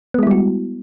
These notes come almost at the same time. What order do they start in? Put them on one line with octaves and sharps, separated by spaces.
B3 G#3 E4 G3 F#4